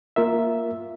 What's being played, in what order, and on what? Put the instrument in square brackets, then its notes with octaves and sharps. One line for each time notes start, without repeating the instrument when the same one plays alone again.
[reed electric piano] A#3 F4 A#4 E5